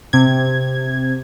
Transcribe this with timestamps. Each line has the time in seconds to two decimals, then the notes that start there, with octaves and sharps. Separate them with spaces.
0.13 C3 G#6